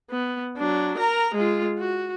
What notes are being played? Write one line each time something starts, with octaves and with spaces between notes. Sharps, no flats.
B3
F#3 D4
A#4 A#5
G#3 F4
F#4